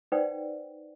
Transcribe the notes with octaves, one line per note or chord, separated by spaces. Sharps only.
D#4 B4 C5 D5 F#5 G5